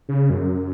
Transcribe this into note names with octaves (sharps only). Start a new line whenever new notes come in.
C#3
F#2